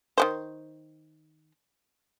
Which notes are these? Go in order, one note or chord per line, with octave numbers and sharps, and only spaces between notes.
D#3 B3 C5